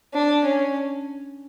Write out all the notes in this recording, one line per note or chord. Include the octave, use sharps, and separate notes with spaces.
D4
C#4